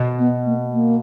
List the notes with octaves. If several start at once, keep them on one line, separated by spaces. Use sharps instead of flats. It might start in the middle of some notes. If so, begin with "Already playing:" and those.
Already playing: B2
B3
A#3
A#3